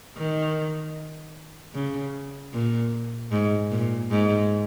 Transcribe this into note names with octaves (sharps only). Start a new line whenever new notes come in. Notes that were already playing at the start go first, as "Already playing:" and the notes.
D#3
C#3
A#2
G#2
A#2
G#2